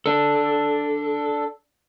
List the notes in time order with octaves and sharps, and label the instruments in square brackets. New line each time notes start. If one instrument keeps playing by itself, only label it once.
[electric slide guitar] D4 A4